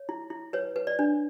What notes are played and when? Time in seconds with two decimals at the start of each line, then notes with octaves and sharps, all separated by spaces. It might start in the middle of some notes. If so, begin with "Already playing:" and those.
Already playing: C#5
0.09 E4
0.30 E4
0.53 B4 C#5
0.76 B4
0.87 D5
0.99 D4